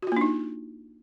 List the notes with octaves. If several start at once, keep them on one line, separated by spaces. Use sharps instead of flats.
A#3 D4 D#4 F4 F#4